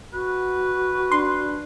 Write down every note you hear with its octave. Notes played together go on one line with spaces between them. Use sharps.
F#4 B4
D4 C6